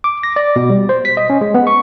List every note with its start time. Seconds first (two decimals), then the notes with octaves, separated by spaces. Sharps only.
0.04 D6
0.23 A#6
0.36 D5
0.56 B2
0.70 G3
0.89 C5
1.05 B6
1.17 D#5
1.30 C#4
1.41 G#3
1.55 B3
1.67 C#6